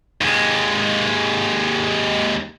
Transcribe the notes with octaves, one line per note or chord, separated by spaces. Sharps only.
D#2 G#3